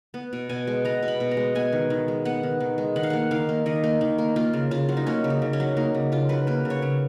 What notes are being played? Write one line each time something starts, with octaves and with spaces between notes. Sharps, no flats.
B3
B2
B2 G#5
G#3
B3 A#5
B2
B5
B2
A#5
G#3
B3 G#5
D#3
D#3
G#3
B3 F#5
D#3
D#3
G#3
D#3 F#5
F5
A#3 F#5
D#3 F5
A#3
D#3 D#5
A#3
D#3
A#3
A#3 F4
C#3
C#3 F4
F#3
D#4
A#3 C#4
C#3
D#4
C#3
C#4
F#3
A#3 D#4
C#3
C#3 F4
F#3 B4
A#3 B4
C#3
C#5
C#3